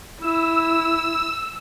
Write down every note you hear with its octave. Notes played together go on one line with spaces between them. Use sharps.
E4 E6